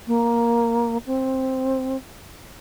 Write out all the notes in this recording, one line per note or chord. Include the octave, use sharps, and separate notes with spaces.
A#3
C4